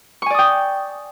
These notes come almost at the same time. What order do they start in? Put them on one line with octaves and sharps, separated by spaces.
C#6 G#5 D5 D#6 G5